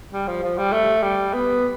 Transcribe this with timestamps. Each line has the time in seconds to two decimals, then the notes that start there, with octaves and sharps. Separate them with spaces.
0.12 G3
0.27 F3
0.43 F3
0.57 G3
0.73 A3
1.03 G3
1.34 B3